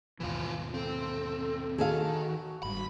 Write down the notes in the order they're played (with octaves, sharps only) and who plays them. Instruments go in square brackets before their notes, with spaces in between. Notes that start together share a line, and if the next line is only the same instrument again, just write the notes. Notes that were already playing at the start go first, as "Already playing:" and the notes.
[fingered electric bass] D#2 G#2 B2 [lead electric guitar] E3 F4
[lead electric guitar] C4 [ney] A4
[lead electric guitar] D#3 [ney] F#4 [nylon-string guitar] G#4 A4 F5
[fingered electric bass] G1 G#2 G3 [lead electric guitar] B5